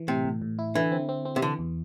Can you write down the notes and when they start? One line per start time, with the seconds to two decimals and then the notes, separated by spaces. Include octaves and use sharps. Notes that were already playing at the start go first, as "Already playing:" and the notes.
Already playing: E3
0.08 A2 C3
0.25 A2
0.42 A2
0.59 E4
0.75 D3 E3
0.92 C4
1.09 C4
1.25 C4
1.36 C3
1.42 D3 E3
1.59 E2